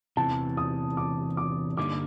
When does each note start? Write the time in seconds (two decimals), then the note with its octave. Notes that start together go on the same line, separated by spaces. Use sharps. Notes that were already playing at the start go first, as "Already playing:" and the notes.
0.17 E2 C3 E3 A5
0.57 D#6
0.97 D6
1.37 D6
1.77 G2 D3 G3 A#3 D#4 D6